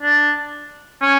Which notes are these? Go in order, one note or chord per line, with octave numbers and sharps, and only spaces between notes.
D4
C#4